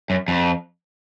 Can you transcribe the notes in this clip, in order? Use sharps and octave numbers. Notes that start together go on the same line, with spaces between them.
F#2
F2